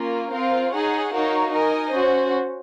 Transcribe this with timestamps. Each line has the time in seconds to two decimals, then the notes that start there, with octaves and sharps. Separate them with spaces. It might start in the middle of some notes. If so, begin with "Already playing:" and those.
Already playing: A#3 C#4 F4
0.32 C4 F4 A#4 F5
0.73 D#4 G#4 C#5 F#5
1.13 D#4 F#4 A#4 C#5 F5
1.52 D#4 A#4 D#5 G#5
1.93 C#4 F#4 C5